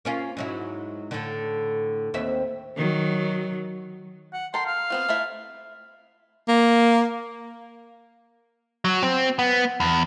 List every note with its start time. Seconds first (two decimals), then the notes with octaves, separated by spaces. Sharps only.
0.05 A#3 C#4 F4
0.37 G#2 F#3 E4
1.11 A2 D3
2.14 D#2 C4 E5
2.77 D#3 F#3
4.33 F#5
4.54 A4 A#4 G5 C6
4.66 F5
4.90 B3 C4 F4
5.09 A3 E4 E5
6.48 A#3
8.85 F#3
9.03 C4
9.39 B3
9.80 E2